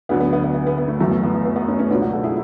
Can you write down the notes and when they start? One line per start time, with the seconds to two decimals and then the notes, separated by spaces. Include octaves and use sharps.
0.09 D2 D3 F#3 B3
0.20 B3
0.33 B3
0.44 B3
0.55 B3
0.67 B3
0.78 B3
0.88 A3
1.00 F#2 E3 A3
1.11 B3
1.23 B3
1.34 B3
1.45 B3
1.56 B3
1.68 A3 C#4
1.79 A3 C#4
1.90 C#2 B2 F#3 B3 D4
2.02 D4 F#4
2.13 F#4 A4
2.24 E4 G#4